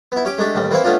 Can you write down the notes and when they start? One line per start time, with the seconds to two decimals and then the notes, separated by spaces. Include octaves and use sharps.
0.12 B3 E4
0.25 C#4 G4 D6
0.38 G#3 A3 D4 G4
0.55 A1 D#2 G3
0.71 E3 A#3 C4 E4 C5
0.84 A3 B3 C#4 D4 F4